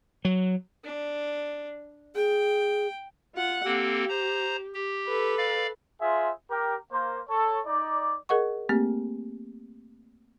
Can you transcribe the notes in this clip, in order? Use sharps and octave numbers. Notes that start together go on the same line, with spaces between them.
F#3
D4
G#4 G5
F4 F#5
A#3 C4 G4 A4
C5 A#5
G4
A4 B4
D5 F5
F4 G#4 C5 E5
G4 A#4
A#3 C5
A4 C#5
D#4 D5
G#4 A#4 D#5 F#5 C#6
A3 A#3 C4 G4